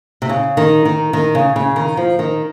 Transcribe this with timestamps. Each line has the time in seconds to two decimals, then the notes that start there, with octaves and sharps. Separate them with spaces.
0.22 C3
0.29 C#3
0.57 D#3
0.85 D#3
1.13 D#3
1.35 C#3
1.56 C#3
1.76 D#3
1.97 F3
2.19 D#3